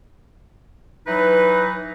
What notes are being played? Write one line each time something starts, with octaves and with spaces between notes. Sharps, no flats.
E3 F#3 D#4 B4